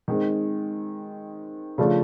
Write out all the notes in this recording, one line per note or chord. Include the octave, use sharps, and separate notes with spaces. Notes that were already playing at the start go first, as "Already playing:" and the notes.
D#3 G#3 C4
C#3 F3 A3 D4 F4